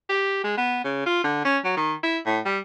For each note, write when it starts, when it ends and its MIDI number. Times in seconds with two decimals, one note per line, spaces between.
0.09 0.40 67
0.44 0.56 56
0.57 0.80 59
0.84 1.01 49
1.06 1.23 65
1.24 1.41 50
1.44 1.58 61
1.64 1.73 54
1.77 1.93 51
2.03 2.18 64
2.26 2.39 45
2.45 2.58 55